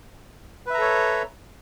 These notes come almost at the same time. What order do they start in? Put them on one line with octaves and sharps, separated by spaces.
B4 E5 A#5 A4 C#5